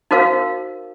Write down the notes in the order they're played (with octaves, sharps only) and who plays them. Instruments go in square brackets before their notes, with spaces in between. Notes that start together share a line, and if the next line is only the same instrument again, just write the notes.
[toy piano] D#4 F#4 A#4 C5 F5